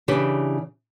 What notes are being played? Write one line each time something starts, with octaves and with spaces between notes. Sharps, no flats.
C#3 E3 D4 G4 B4